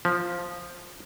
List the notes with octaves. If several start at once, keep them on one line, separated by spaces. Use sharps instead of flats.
F3